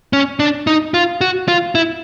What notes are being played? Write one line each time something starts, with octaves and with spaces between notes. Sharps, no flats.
C#4
D4
D#4
F4
F#4
F4
E4